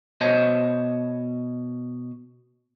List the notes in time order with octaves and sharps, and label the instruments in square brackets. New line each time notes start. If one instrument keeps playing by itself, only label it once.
[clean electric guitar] B2 C5 C#5 D#5 A5